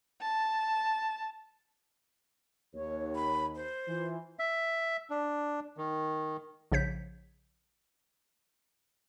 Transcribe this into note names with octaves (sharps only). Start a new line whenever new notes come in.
A5
D#2 C#5
B5
C5
E3 F4
E5
D4
D#3
A#1 C#3 C#5 G6 B6